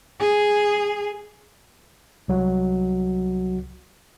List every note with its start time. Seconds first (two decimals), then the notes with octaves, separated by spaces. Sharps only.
0.20 G#4
2.28 C2 F#3 F#4